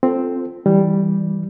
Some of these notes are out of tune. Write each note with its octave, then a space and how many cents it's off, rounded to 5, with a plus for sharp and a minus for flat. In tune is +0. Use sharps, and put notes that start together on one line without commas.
C4 +0 F4 +0 A4 +0
E3 -15 G3 +0